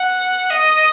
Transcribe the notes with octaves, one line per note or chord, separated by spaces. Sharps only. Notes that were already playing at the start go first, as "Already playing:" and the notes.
Already playing: F#5
D#5